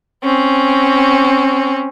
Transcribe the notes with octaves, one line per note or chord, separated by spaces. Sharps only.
C4 C#4